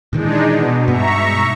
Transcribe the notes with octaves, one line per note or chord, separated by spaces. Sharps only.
A#2 D#3 E3 G#3 D4 D#4
B2
G2 B3 E5 A#5 C#6